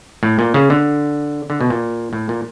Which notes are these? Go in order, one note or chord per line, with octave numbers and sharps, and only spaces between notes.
A2
A#2
C#3
D3
D3
B2
A#2
A2
A#2